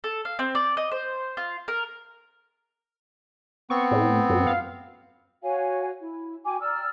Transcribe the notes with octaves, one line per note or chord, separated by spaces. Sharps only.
A4
F5
C4
D5
D#5
C5
F4
A#4
B3 C4 C#6
A2
F#2
F5
F#4 C#5 F5 G#5
E4
F#4 G5 G#5 D6
D5 A#5 E6 F6